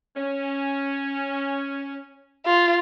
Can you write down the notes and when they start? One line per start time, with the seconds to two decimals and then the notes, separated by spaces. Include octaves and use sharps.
0.16 C#4
2.45 F4